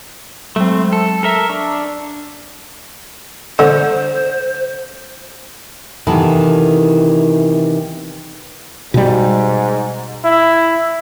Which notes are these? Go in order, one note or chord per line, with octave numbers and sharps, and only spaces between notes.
F#3 G#3 A3 C4
A4
A4 A#4 E5
D4 C#6
D3 C5
C3 D#3 E3 B3 E4 A4
G#2 B2 G3
E4